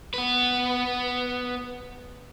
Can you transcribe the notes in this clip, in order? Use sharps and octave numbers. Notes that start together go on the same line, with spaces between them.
B3 B4